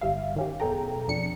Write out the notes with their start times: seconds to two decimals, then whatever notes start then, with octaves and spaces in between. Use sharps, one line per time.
0.01 G1 G3 E5 F5
0.36 D#3 C#4 G4
0.60 F#2 B2 G#4 A4 G5 A#5
1.08 F2 B2 D4 C#7